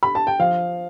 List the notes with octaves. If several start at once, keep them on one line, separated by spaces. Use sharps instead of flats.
B5
A5
G5
F3 F5